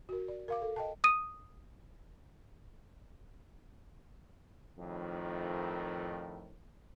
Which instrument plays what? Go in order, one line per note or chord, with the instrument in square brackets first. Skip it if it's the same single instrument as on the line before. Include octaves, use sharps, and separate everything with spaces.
[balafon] F#4 A#4
D5
A#4 F5 D6
A4
D#5 G5 A5
[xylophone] D#6 D#7
[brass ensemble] F2 A2 D#3